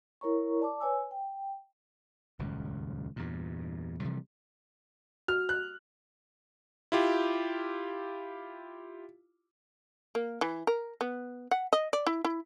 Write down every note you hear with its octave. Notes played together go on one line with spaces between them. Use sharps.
E4 A#4 C#5 A#5 C#6
D5 A5 D6
B4 C#5 G#5 E6
G5
D#1 C#2 F#2
E2 G2 A#2
C3 E3 F3 G3
F#4 F6
F#6
E4 F4 G4
A#3
E3
A#4
B3
F#5
D#5
D5
E4
E4